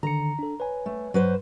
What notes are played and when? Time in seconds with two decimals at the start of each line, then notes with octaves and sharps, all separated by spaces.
0.03 D3 D#3 A#5 C#7
0.39 D4 A4
0.60 B4 C#5 G#5
0.86 A3
1.14 G2 F#3 B4 C5